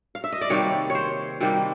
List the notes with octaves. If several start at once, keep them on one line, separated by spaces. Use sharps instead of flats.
F5
E5
D#5
D5
C3 D#3 G3 A#3 C#5
C#5
C5
C3 D#3 G3 A#3